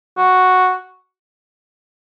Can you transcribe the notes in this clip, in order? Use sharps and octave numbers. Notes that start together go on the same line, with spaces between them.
F#4